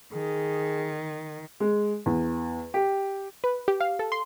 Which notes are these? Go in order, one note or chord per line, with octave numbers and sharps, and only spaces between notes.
D#3 G#4
G#3
E2
G4
B4
G4
F5
A4
C6